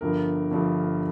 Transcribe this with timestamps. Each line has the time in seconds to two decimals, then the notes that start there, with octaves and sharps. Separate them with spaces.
0.01 G1 G2 F3 A#4
0.51 G1 G2 F3